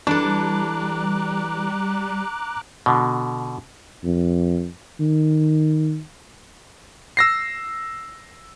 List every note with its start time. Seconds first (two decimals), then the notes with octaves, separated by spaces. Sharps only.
0.07 E3 G3 D4 A4 A#5 D6 F#6
2.86 B2 D3
4.04 F2
5.00 D#3
7.17 E6 A#6 C7